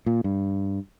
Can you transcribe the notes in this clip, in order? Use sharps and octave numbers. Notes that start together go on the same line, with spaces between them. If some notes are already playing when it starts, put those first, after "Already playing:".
A#2
G2